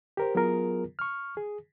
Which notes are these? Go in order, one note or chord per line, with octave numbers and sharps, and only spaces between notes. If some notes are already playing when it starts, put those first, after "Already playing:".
G4 A#4 C5
F#3 B3 F4 G#4 A#4
C#6 F6
G#4